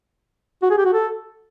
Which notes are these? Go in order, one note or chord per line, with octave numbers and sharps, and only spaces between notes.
F#4
G#4
G4
F#4
A4